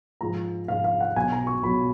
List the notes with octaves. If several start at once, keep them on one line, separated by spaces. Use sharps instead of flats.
G#2 F3 G#3 A#5
G#2 F3 G#3 F5
F5
F#5
B1 B2 F#3 G#5
A#5
C#6
B1 B2 F#3 B5